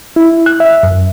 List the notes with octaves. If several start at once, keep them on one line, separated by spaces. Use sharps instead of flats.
E4
F#6
E5
F#2